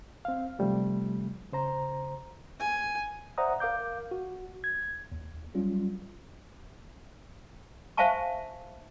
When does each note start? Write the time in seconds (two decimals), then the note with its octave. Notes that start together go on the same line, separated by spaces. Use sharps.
0.25 C4 F5
0.59 C3 F3 G3 A3
1.52 C#3 C5 A#5
2.60 G#5
3.38 C5 D5 E5 F#5 A#5 D#6
3.60 A#4 F5 D6 G6
4.11 F#4
4.64 G#6
5.12 D#2
5.54 F#3 G3 C#4 F4
7.97 C5 E5 F5 G#5 A5 C#6